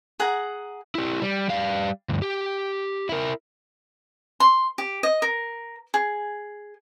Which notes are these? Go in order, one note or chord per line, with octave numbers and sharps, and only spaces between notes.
G#4 F#5 A#5
E4 G4
G3
G3 F5
D2 G2
G4
E4 A#4
C6
G4
D#5
A#4
G#4